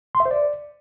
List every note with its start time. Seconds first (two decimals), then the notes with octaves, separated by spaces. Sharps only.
0.15 C6
0.20 E5
0.25 C5
0.31 D5